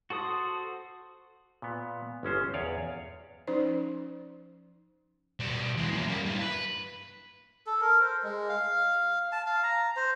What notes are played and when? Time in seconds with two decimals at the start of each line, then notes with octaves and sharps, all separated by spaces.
0.10 F#4 A4 C5 D#6
1.62 A#2 B3
2.23 G1 G#3 C#4 C5
2.54 E2 C#5 D5 F5 G#5
3.47 F3 C#4 D#4 C5 D5
5.40 B2 G3
5.78 E3 G#3
5.91 F#2 A#2
6.08 G3 A#3
6.25 G2 E3
6.40 B4
7.67 A4
7.81 A#4
8.01 C5
8.23 G#3
8.49 F5
9.32 A5
9.46 F5
9.63 A#5
9.96 C5